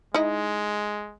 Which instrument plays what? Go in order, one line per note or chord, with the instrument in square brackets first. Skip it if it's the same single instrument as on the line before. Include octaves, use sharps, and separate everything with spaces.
[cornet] G#3 [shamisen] D#4 E4 D#5